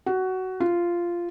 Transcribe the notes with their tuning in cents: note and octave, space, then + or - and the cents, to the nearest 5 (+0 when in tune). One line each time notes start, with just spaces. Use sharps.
F#4 +15
F4 -10